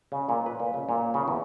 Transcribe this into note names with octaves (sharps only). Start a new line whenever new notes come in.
C#3
A#2
B4
A#2
C#3
A#2
C#3
E2